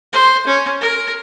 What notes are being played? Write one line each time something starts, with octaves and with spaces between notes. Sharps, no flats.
C5
C#4
A#4